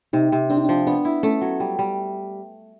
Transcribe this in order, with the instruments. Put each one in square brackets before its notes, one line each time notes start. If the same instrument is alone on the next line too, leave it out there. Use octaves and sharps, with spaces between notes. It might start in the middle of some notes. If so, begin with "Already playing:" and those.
[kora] C3 [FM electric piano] D#4
[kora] C3
[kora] C4 [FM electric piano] D4
[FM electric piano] D#4
[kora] F3 [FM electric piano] D4
[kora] B3 [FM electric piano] D4
[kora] E4
[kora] A3 [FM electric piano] C#4
[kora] F#3
G3
G3